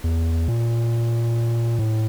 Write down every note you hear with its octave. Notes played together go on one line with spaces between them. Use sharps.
E2
A#2
A2